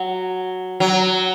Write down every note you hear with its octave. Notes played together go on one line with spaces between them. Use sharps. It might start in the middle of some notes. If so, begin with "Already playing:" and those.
Already playing: F#3
F#3